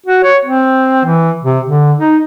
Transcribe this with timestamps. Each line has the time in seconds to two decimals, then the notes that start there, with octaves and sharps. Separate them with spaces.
0.06 F#4
0.23 C#5
0.45 C4
1.05 E3
1.44 C3
1.66 D3
1.97 D#4